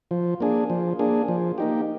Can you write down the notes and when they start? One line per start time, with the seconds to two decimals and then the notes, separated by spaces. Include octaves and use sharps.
0.11 F3
0.40 A#3 D4 G#4
0.70 F3
0.99 A#3 D4 G#4
1.28 F3
1.58 A#3 D#4 G4